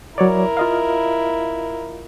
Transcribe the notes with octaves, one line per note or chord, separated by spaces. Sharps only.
F#3 E4 A#4 C#5 D5
F4 D#5 F5